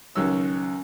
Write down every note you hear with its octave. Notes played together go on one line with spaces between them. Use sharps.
C#2 D#3 F#3 C#4 E6